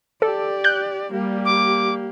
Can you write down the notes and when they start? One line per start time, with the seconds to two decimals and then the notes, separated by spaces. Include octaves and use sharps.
0.22 G4 A4 D5
0.64 F#6 G6
1.12 G3 A#3 G4
1.45 D6